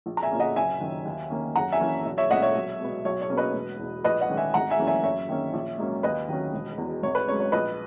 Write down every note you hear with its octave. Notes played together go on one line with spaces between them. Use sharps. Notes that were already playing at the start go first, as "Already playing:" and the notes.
A#1
A#5
E5 G#5
A#2 A#3 C#4
D#5 F#5
F#1 E5 G#5
F#2 D#3
D#2
D#3 A#3 C#4
F#2 F#5 A#5
E5 G#5
E3 A#3 C#4
B1
C#5 E5
A#2 G#3 C#4 D#5 F#5
C#5 E5
B1
B2 G#3 B3
B1 C#5
C#5
B2 A#3 C#4
B4 D#5
E1
E2 B2
A#1 B4 D#5
D#5 F#5
G#2 D#3 G#3 C#4
E5 G#5
G#1 F#5 A#5
E5 G#5
F#2 E3 A#3 C#4
E5 G#5
F#2 C#5 E5
D#3 A#3 C#4
A#1
G#2 F#3 A#3 C#4
D#2 B4 D#5
D#3 F#3 C#4
E1
E2 B2
G#1 C#5
B4
G#2 F#3 C#4 C#5
C#5
A#1 B4 D#5